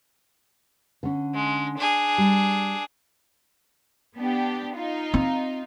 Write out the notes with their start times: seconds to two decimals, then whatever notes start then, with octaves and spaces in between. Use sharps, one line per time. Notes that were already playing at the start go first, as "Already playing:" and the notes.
1.03 D3 C#4
1.34 G#3
1.77 D4 G#4
2.18 G3
4.16 B3 D4 G4
4.75 D#4 F4
5.14 C4